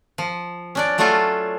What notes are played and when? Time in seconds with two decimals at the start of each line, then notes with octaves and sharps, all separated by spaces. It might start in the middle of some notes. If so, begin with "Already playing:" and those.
0.18 F3
0.75 C#4 D4 D5
0.98 F#3 A3 C#4 D4 F4 A4